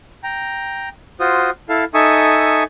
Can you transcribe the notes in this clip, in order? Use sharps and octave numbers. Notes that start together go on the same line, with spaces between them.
G5 A#5
F4 F#4 C5 D#6
E4 A4 F5
D#4 A4 E5 G#5 C#6 D#6